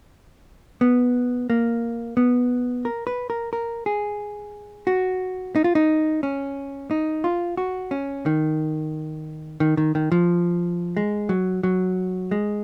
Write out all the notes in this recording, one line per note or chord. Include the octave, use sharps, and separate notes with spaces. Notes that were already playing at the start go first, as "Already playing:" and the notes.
B3
A#3
B3
A#4
B4
A#4
A#4
G#4
F#4
D#4
F4
D#4
C#4
D#4
F4
F#4
C#4
D#3
D#3
D#3
D#3
F3
G#3
F#3
F#3
G#3